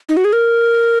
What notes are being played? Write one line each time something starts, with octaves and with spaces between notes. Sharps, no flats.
D#4
F#4
G#4
A#4